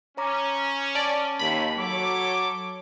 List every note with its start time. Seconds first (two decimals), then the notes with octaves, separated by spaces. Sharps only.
0.17 C#4 C#5 A#5 D6
0.95 D5 A5
1.39 D#2 B5
1.77 F#3 A4 C#5 D6